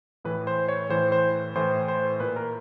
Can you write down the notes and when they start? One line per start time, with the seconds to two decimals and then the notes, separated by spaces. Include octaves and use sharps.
0.25 A2 E3 B4
0.47 C5
0.68 C#5
0.89 A2 E3 C5
1.12 C5
1.55 A2 E3 C5
1.88 C5
2.20 A#2 B4
2.36 A#4